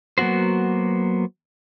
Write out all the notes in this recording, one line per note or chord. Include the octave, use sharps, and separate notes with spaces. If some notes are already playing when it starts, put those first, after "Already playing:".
F#3 A#3 B3 F#4 C5